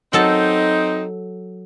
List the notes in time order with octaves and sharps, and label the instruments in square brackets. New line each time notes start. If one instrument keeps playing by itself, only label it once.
[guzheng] F#3 A4 A5 [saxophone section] C4 D#4